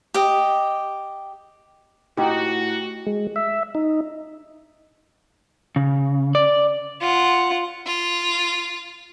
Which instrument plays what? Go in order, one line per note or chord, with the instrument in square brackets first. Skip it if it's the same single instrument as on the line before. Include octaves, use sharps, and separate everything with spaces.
[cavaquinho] G4 D#5
[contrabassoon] A2 [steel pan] D#4 G4 [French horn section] F#4
[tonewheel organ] G#3
E5
D#4
[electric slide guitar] C#3
D5
[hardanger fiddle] F4 F#5
[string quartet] F4